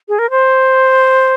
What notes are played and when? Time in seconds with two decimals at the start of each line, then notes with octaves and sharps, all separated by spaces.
0.09 G#4
0.19 A#4
0.30 C5